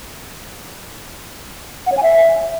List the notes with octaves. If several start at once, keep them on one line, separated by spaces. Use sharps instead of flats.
F#5
C#5
G#5
E5